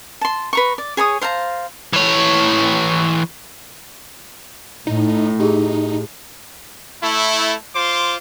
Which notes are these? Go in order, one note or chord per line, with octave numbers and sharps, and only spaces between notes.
A5 C6
B4 A#5 C#6
D5
G#4 C#5 B5 D#6
C5 F5 A5 A#5
E3 C#5
A2 D#4
D#4 G4 G#4
A3 E4
F4 C5 C6 D6